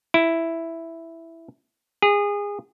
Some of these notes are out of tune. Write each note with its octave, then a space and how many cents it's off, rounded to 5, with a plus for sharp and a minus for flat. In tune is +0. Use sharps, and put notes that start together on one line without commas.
E4 +0
G#4 -25